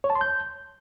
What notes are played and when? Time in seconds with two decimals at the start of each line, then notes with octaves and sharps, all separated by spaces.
0.04 C#5
0.10 A5
0.15 C6
0.21 G6